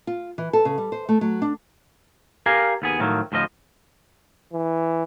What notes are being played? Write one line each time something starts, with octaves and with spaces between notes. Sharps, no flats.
F4
E3
A4
C#3
G3
C5
A3
F#3
D4
G4 A#4 F5 G#5
D#2 B3 G#4
A2 D#3 F3 F#3
D2 A2 F3 D#5
E3